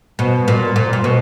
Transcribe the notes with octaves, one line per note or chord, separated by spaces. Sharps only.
B2
A#2
A#2
A#2
B2